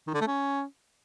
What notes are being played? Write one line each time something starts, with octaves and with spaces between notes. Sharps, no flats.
D#3
D3
A3
C#4